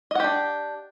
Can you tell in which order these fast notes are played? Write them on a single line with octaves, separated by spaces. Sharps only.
D#5 F#5 G4 D4